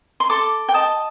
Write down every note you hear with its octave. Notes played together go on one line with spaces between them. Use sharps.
C6
A4 D6
G5
D#5 A5